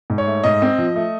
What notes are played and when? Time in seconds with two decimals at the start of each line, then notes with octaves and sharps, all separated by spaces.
0.10 G#2
0.18 C#5
0.27 A3
0.44 G#2 D#5
0.62 C4
0.78 F3
0.96 A3